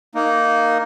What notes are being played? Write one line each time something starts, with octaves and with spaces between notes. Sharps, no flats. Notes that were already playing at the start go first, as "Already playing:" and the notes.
A#3 D#4